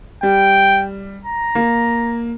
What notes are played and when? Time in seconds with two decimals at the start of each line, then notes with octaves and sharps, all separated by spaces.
0.23 G3 G5
1.25 A#5
1.55 A#3